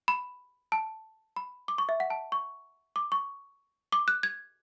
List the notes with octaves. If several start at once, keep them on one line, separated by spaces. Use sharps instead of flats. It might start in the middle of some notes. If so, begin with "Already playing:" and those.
B5
A5
B5
D6
C#6
E5
F#5
A5
C#6
D6
C#6
D6
F#6
G#6